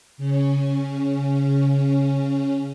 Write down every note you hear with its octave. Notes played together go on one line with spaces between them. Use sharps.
C#3 C#4